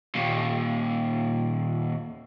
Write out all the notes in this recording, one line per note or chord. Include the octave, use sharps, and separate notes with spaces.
D#2 A#2